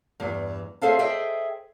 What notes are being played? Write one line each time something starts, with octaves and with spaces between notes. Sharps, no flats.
E2 G2
G#4 A4 C5 E5 F5 A5
G#4 C5 D#5 E5 G5